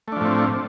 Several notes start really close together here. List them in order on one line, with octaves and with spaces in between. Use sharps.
A3 D4 F3 A2 C4